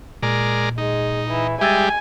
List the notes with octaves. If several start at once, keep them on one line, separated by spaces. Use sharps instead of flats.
A#2 G#3 A#4 D5
G#3 D#4
E3
G3 G#3 G4 E5 G#5 E6 A6